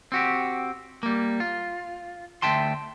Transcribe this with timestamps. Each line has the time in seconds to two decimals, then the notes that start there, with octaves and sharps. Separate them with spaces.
0.12 C4 F#4 G4
1.03 G3 A#3
1.40 F4
2.42 D2 E3 E5 G5 A5 C6